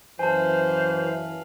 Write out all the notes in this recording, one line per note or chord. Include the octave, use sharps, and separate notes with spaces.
F#2 E3 B4 C5 F5 G#5 A5